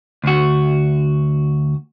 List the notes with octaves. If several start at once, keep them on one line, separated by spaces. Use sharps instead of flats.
D2 F#4